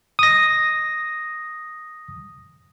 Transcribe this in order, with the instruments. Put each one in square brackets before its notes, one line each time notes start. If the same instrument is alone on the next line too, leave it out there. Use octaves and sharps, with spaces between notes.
[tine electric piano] D#6 A#6